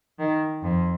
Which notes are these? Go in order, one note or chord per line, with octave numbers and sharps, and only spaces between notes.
D#3
F2